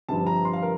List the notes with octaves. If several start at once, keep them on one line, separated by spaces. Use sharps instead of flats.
G1 G2 F3 C4 A5
A#5
C6
F5
A#4